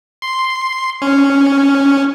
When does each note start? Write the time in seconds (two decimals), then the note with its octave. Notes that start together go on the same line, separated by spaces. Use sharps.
0.22 C6
1.02 C#4